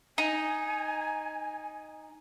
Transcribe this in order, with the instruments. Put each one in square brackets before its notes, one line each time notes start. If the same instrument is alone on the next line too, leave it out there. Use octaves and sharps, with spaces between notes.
[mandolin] D#4 [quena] G#5